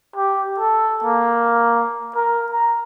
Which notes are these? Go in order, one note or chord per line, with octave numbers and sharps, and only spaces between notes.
G4
A4
A#3
A#4
A#5